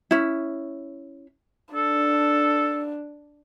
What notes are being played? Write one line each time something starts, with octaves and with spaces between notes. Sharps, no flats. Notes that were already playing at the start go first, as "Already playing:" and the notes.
C#4 E4
D4 A4